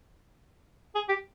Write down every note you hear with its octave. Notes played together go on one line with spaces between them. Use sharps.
G#4
G4